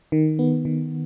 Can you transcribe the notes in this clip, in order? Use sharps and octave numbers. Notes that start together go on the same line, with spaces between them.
D#3
B3
D#3